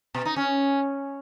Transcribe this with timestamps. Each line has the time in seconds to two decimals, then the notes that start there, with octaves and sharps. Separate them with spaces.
0.14 B2
0.25 D#4
0.36 C#4